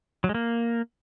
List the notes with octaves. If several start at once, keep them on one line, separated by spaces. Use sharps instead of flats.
F#3
G#3
A#3